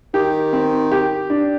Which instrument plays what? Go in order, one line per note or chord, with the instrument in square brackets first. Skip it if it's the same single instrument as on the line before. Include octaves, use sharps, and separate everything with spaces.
[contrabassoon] D#3 [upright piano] G4
[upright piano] C4
G4
D4